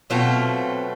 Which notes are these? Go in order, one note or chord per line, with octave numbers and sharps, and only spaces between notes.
B2 F#3 A3 C4 F4